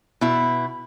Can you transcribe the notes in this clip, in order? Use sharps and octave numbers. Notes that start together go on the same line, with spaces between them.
B2 E4